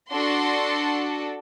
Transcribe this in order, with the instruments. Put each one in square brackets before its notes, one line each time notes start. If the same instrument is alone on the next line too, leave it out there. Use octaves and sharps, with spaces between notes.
[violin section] D4 F#4 A4 C6